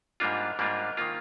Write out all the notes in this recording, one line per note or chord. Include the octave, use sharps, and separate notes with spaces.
G#2 G3 A#3 D4 F4
G#2 G3 A#3 D4 F4
D#3 A#3 F4